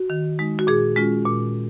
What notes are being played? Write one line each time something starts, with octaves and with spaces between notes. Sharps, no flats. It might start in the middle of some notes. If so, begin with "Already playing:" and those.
Already playing: F#4
D#3
G#3 D#4
F#4
A#2 G#4
G#3 C#4 F4
A#2